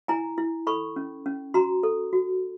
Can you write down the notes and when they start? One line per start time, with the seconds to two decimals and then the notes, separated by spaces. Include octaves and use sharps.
0.08 E4 G#5 A#5
0.38 E4
0.67 A4 B5 C#6
0.96 C#4
1.26 C#4
1.54 F#4 A#5 C6
1.83 A4
2.13 F#4